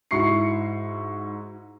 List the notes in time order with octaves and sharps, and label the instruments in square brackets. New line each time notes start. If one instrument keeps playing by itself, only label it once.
[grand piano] G#2 E4 F#4 C#6 C7 C#7